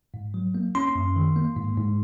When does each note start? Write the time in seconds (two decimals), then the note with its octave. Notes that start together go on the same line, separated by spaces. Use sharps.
0.14 G#2
0.34 F#3
0.55 A#3
0.75 C#4 C6
0.95 F#2
1.16 D#3
1.36 A#3
1.56 G#2
1.77 G#2